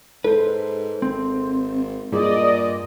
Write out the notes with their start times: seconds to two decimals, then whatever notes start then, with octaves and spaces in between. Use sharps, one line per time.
0.24 G#2 A4 B4 C5
1.02 G#1 C4
2.12 G2 A#2 G#4 D5 D#5